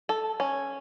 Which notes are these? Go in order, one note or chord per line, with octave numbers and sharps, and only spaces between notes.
A4
C#4